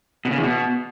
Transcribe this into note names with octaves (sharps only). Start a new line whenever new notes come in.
B2
C#3
E2
B2